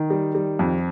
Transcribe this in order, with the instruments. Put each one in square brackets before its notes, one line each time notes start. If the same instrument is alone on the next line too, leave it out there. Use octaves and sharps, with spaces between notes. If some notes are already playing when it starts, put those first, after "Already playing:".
Already playing: [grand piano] D#3
[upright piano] G3
G3
F2